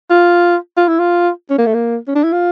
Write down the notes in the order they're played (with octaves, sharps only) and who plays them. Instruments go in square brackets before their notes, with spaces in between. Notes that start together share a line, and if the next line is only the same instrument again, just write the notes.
[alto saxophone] F4
F4
E4
F4
C#4
A#3
A3
A#3
C#4
D4
E4
F4